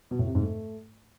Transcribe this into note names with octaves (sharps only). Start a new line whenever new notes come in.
B2
A2
C3
G#2
A3